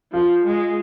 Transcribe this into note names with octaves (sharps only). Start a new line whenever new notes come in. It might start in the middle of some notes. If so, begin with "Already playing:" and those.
F3 F4
G#3